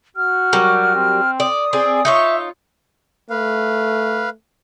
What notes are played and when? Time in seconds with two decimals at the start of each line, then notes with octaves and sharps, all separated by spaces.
0.17 F#4 F6
0.53 F#3 G3 A#4
0.96 C4
1.40 D5 D#6
1.73 C4 G#4 D5
2.05 D#4 F4 C#5 E5
3.30 A3 B4 F5